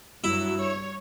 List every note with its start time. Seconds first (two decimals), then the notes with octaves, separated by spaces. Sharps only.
0.24 G2 F#3 E4
0.62 C#5